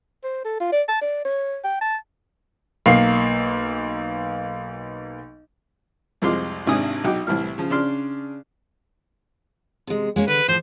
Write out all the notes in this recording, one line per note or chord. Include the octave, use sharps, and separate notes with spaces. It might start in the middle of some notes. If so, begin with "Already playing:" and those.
C5
A4
F4
D5
A5
D5
C#5
G5
A5
B1 A#3 C7
C2 F2 G#3 F4 C6 D6
G#1 G#2 C3 D4 G#5 D#6
B1 D#4 F#4 G5 D6
C2 A2 E3 F6
C#3 F3
C#3 D4 D5 C6 F6
C3 G#3
G#3 A#3 C#4
D3 B4
A2 F3 C5